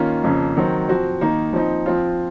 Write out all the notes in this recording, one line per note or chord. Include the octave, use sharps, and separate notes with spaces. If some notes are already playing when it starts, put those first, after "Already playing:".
Already playing: D#3 A#3 C#4 F4
F2 C#3 F3 A#3 C#4
D#3 F#3 C4
F3 C4 F#4
D#3 A#3 D#4
F3 C4 D#4
F3 C4 F4